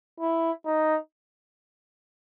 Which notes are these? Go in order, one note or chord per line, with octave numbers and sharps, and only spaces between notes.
E4
D#4